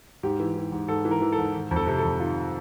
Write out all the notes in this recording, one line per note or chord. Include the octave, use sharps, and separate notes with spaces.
G#2 G4
E3
E3
G#2
G#2 A4
E3
A#4
E3
A4
G#2
D#3
F2
A4
C3
F2 A4
D#3 F4